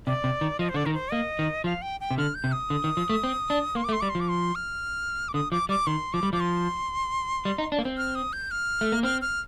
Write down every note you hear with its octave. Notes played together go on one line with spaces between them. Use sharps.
C3 D5
C3
D#3
F3 D#5
C5
D3 D5
D#3 A#4
C5
A#3 D#5
D#3
F3 F5
G5
G5
C3
D3 F6
G6
C3
D#6
D3
D#3
F3
A3
C4
D4
A#3 C6
D6
A3
C6
G3 D6
C6
F3
D6
C6
F6
D6
D3 D#6
F3 D6
G3 D6
D#3 C6
F3 D6
G3
F3 D6
C6
G3
D#4
D4
A#3
C4
F6
D#6
G6
F6
A3
A#3
C4 F6
F6